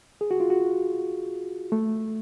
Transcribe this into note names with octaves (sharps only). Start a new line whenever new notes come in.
G#4
F#4
F4
F#4
A3